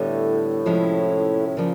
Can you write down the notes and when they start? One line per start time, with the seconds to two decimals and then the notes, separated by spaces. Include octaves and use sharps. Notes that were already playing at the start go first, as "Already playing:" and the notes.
Already playing: A2 D3 G3 B3
0.66 C3 F3 G#3 C#4 E4
1.47 A2
1.57 A#2 C#3 F3